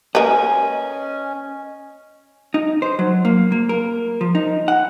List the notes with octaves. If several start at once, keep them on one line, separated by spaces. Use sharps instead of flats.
A#3 C#4 A#4 B4 D#5 G#5
D#4
C5
F#3
A#3
A#3
A#4
F3
D#4
F#5